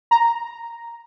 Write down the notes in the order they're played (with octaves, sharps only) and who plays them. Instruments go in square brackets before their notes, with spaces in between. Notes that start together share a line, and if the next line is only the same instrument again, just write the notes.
[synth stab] A#5